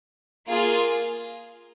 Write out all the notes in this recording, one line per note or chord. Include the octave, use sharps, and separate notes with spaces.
A#3 F4 G#4